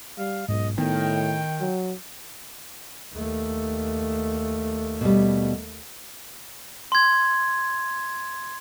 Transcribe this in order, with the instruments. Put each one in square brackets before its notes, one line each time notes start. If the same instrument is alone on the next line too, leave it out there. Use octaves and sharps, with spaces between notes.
[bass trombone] G3 [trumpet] F5
[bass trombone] B1 [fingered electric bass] G#2 [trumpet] D#5
[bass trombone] A2 [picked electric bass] D#3 [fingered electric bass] B3 [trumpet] G5
[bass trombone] F#3
[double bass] D#2 A3
[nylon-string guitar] B2 G3
[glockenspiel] C6 G#6